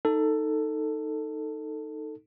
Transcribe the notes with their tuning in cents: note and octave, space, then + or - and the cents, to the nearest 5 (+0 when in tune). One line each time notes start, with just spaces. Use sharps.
D#4 +0 A4 +15